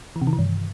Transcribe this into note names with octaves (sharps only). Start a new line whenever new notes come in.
E3
C3
D#3
E3
G2